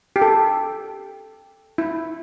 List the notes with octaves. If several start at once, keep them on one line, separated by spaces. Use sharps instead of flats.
G4
A4
E4